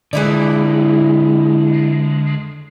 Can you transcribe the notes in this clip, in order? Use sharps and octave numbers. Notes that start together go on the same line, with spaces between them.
D3 E3 G#3 E4 D5